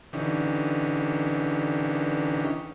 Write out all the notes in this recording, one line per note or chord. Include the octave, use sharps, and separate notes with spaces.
D3 E3 C#4 D#4 G4